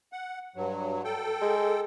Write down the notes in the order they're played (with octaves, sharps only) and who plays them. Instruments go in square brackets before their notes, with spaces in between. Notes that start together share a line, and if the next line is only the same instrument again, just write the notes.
[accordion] F#5
G2 F#3
A4 G5
[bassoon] G#3